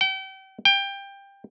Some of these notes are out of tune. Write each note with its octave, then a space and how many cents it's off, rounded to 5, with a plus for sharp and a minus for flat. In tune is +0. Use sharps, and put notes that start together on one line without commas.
G5 -35
G5 +20